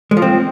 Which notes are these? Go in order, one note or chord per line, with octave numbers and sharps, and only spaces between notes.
G#3
F3
C4